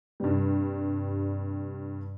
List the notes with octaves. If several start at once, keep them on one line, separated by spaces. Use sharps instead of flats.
G2 C3 G3